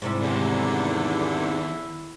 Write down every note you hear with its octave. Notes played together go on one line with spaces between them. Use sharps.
G#2 C3 G3 E4
E2 D3 D#3 C#4